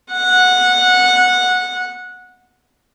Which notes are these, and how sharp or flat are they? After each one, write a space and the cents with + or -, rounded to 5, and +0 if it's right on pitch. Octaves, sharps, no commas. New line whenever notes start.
F#5 -15